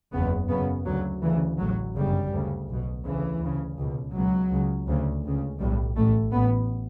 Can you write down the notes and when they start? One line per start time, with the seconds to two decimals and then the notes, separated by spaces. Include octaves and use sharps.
0.13 F#1 E2 C#3 B3
0.49 F#1 F#2 C#3 B3
0.85 D2 C#3 F#3
1.22 D2 C#3 E3
1.59 A1 A2 F#3
1.95 G1 F#2 C#3 G3
2.32 D2 C#3
2.68 B1 B2
3.05 D2 C#3 E3
3.41 D2 C#3
3.78 C#2 B2
4.14 C#2 B2 F#3
4.51 C#2 C#3
4.87 D2 C#3
5.24 C#2 C#3
5.60 B1 A2 G3
5.96 A1 A2 A3
6.33 A1 A2 B3